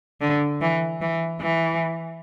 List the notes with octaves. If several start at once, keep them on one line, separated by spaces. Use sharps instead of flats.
D3
E3
E3
E3